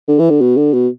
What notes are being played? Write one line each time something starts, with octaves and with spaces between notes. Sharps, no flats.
D3
E3
D3
B2
D3
B2